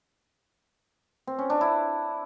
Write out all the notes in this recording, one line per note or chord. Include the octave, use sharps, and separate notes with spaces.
C4
C#4
D4
E4